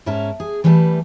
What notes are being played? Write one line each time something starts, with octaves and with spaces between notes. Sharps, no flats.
G#2 C#4 A#4 E5 A5 A#5
G#4
E3 G3 A3 B4 G#5 A5